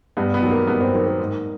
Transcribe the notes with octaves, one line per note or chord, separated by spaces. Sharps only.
G2 B3
B3
D#3 F#3
A#3
G2 B3
C4
D#3 F#3 A#3
A#3
G#2